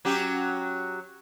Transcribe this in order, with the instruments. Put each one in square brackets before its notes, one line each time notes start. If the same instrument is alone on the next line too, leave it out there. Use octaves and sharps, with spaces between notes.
[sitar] F#3 C#4 G4